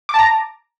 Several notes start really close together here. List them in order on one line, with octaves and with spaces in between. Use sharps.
D6 A5 A#5